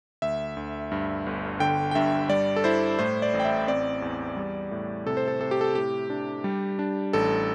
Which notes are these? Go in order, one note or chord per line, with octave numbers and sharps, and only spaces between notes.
D2 E5
D2
G2
G1
D3 G5
G5
G2 E5
G3 D5
A4
E4 C5
A2 C5
D5
A1
G5
E5
C4 D5
E2
G3
A2
C3 A4
C5
A4
C3 A4
G4
A4
A2 G4
D4
G3
D4
A1 A4